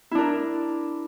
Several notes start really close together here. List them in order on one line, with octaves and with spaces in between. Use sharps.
E4 D4 A#4